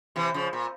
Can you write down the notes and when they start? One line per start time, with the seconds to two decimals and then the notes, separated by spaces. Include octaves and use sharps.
0.16 C3 E3
0.34 C#3 F3
0.53 A#2